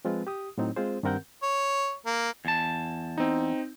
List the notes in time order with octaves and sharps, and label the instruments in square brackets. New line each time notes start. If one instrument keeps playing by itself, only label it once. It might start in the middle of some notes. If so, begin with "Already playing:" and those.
[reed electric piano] F3 G#3 C4 F4 B4
G4 D#6
A2 F#3 C4 D#4
G#3 C4 F4 G#4 C5
G2 D#3 C4 A#4 F#5 G6
[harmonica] C#5
A#3
[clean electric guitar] E2 A5
[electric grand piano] C4 D#4